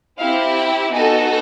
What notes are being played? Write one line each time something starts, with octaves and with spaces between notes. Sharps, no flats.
C4 E4 G4 F5
G5
B3 D#4 F#4 A4 G#5